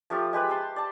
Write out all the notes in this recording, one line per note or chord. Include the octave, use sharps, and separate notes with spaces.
F3 A3 F4 G4
G#3 G4 B4 B5
E5 A5 C6
D5 A5